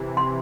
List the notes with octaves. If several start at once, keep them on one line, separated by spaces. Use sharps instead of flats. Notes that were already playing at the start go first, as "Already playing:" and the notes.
Already playing: C3 E3
C6